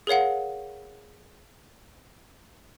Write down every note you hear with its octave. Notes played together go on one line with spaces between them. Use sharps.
G#4 A#4 C#5 F5 F#5